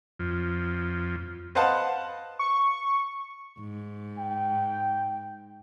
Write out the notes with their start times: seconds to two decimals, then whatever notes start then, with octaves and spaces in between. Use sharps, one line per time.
0.19 F2
1.55 B4 C5 D#5 F5 F#5 A5
2.39 C#6
3.60 G#2
4.18 G5